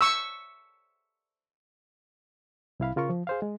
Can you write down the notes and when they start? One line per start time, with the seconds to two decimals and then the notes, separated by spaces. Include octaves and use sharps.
0.01 C#6 E6
2.80 C2 E4 F5 B5
2.96 C#3 F4 A#4 C#6
3.10 F3
3.27 G#4 C5 F5
3.42 G#3